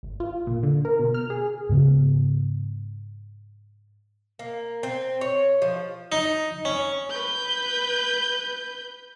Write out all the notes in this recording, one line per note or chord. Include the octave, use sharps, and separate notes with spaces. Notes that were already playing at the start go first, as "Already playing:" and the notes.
G#1
F4
A#2
D3
A#4
B2
F6
G#4
G#2 C#3 B3
A#3
C4
C#5
F3
D#4
C#4
B4 G6